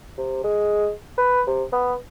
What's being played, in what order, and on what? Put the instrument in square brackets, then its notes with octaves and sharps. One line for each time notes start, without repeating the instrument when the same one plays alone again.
[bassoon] C3
G#3
B4
C3
B3